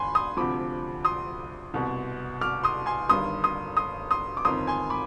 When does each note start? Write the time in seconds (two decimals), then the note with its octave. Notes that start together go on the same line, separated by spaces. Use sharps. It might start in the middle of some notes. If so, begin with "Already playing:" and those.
Already playing: G1 G#5 B5 C6
0.15 C6 D#6
0.37 D2 C3 F3 B5 D6
1.05 C6 D#6
1.74 C2 B2
2.41 D6 F6
2.63 C6 D#6
2.86 G#5 C6
3.09 G1 G2 D#3 C6 D#6
3.44 C6 D#6
3.77 C6 D#6
4.11 C6 D#6
4.37 D6
4.45 G1 F2 D#3 C6 D#6
4.67 G#5 C6
4.90 B5 D6